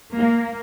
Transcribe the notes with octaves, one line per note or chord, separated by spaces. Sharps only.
A#3